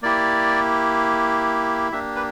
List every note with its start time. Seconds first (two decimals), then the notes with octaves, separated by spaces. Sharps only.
0.02 A#3 E4 G4 D5
1.92 A#3 D4 G4 E5
2.15 B4